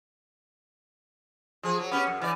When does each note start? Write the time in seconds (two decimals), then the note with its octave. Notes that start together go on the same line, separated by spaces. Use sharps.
1.63 F3 G#4
1.79 F#3
1.91 B3 C#4 G4
2.07 F#2
2.22 E3 D5